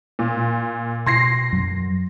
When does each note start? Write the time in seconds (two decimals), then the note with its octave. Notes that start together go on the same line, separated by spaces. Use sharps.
0.19 A#2
1.06 B2 C6 A#6 C7
1.52 F#2 F#3